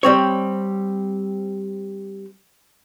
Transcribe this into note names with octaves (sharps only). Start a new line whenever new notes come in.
G3 C4 C#5